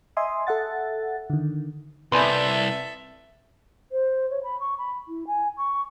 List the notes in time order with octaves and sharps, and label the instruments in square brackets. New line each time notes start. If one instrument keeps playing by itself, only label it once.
[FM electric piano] D#5 E5 G#5 C6 D#6
A4 E5 F#5 A6
D3 D#3
[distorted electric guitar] C2 [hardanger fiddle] A4 E5 [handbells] B4 D5 [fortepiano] G#5 B5 C6
[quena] C5
C#5
B5
C#6
B5
E4
G#5
C#6